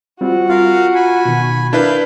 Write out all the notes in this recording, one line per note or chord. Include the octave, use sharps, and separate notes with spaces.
G3 C4 F4 F#4
F4 A#4 F5
G#5 B5
B2 D#3
D4 E4 A#4 B4 F5 G6